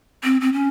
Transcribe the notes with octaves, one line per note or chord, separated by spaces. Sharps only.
C4
C4
C#4